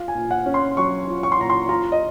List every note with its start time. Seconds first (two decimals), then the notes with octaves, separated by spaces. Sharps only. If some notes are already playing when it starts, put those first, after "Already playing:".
Already playing: F4 F5
0.08 G#5
0.15 A#2
0.31 F#5
0.46 C#4
0.54 C6
0.77 F#3 C#6
1.08 F4
1.23 C#6
1.32 C6
1.39 A#2 A#5
1.50 C6
1.69 F4 A#5
1.92 D#5